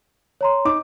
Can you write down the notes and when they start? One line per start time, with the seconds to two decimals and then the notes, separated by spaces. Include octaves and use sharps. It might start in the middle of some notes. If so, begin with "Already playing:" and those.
0.41 C#5 A#5 C6
0.65 D#4 D6